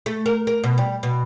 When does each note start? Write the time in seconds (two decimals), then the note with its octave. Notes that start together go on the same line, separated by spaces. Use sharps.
0.06 A3
0.26 A#4
0.47 A#4
0.64 B2
0.78 G3
1.03 B2